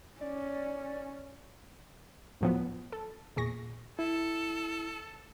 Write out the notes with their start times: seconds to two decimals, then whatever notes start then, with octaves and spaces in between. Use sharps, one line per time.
0.21 C#4 D5
2.41 D2 A2 F3 F#3 B3
2.92 A4
3.36 E2 A#2 G#4 C#6 A#6
3.99 E4 A4